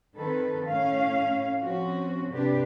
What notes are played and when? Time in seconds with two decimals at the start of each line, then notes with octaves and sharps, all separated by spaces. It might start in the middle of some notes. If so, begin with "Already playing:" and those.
0.17 D#3 C4 A4 B4
0.68 A2 C#4 F5
1.61 F3 C4 C#4 F#4
2.32 C3 D4 G4 B4